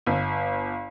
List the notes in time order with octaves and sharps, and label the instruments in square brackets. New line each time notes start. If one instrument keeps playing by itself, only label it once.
[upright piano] G1